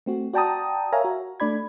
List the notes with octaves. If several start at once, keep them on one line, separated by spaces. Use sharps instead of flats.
A3 C4 F#4
F#4 D5 G5 A5 A#5 D#6
A#4 C#5 E5 F5 G#5 A#5
F#4
A3 D4 D5 B5 G#6